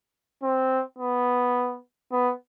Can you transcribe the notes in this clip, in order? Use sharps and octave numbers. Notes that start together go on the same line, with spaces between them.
C4
B3
B3